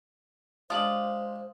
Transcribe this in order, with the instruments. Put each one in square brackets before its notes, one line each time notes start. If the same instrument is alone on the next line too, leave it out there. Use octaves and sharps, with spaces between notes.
[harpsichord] G#3 G4 [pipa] D4 F4 [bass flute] C5 [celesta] D#6 F#7